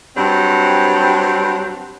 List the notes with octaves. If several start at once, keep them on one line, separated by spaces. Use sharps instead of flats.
G2 F#3 C4